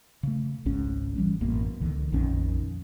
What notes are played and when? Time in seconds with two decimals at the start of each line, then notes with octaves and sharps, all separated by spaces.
0.23 C#3 A3
0.65 G#1 C#2 G#2 C#4
1.16 E3 G3 C#4
1.41 A1 F#2 B2 A#3
1.81 C#2 D3 D#3
2.12 A#1 F2 D#3 C#4